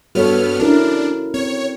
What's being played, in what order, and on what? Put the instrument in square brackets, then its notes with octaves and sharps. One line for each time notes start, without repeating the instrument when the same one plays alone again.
[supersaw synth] G2 B3 F6 [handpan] F#4 A4 C#5
[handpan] C#4 E4 A#4 [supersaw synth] D4
[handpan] C4 [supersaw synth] C#5